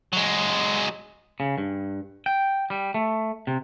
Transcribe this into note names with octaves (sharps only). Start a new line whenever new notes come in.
F#3 G#3
C#3
G2
G5
G3
A3
C3